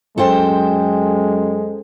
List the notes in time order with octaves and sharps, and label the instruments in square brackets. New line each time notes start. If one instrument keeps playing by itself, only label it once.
[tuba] F#2 [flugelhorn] G#3 [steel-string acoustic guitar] A4 C5 G5